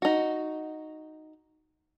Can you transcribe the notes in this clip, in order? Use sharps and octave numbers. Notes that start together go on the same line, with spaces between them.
D#4 F#4